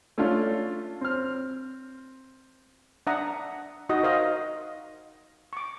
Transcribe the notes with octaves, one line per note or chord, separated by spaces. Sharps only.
A3 C#4 D4 F4
C4 F6
D4 E5 F#5 A#5 D#6
D#4 F#4 D#5 D#6
A#4 C5 D#5 F5
C#6 D6